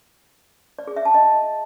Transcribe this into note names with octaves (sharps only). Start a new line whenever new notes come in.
D5
G#4
E5
A5
D#5